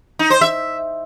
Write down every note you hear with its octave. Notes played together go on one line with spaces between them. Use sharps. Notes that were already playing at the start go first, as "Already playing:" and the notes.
D#4
C5
E5